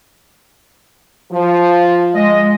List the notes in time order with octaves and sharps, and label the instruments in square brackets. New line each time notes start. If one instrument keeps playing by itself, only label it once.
[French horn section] F3
[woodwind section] G#3 D#5